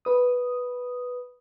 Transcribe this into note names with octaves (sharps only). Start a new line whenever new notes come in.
B4 D#6